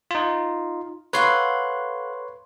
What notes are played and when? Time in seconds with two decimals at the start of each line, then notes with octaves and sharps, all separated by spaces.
0.11 D#4 F4
1.13 A4 B4 C#5 F5 F#5 C6